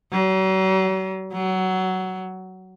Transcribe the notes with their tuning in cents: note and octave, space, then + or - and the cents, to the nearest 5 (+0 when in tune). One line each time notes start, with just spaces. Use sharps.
F#3 +40
F#3 +15